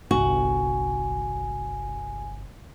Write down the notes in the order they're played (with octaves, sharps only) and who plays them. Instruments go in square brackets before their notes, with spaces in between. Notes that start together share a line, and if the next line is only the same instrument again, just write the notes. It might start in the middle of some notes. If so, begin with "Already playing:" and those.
[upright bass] G1 C2 [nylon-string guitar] F#4 [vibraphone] G#5